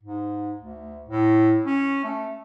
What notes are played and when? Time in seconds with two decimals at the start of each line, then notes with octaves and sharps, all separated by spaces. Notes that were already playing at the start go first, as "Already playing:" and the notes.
0.03 G#2
0.61 D2
1.09 A2
1.65 C#4
2.04 A3